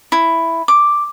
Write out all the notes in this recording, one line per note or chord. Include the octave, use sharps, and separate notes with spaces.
E4
D6